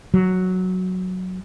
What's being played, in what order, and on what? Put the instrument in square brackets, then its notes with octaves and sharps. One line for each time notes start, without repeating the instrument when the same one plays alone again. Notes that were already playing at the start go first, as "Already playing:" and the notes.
[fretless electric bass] F#3